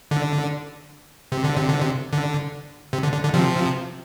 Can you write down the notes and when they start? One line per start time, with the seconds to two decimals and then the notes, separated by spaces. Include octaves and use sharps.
0.11 D3
1.32 C3
1.44 D3
1.57 C3
1.69 D3
1.80 C3
2.13 D3
2.93 C3
3.03 D3
3.13 D3
3.23 D3
3.34 C3 F3